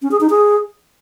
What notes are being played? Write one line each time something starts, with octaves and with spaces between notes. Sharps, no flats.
C#4
G#4
D#4
G#4